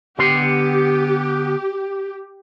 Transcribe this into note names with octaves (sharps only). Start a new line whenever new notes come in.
D3 B3 G4 C6